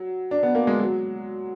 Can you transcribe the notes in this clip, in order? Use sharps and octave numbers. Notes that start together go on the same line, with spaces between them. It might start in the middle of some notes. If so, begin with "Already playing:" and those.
Already playing: F#3
D4
B3
A#3
G#3
F#3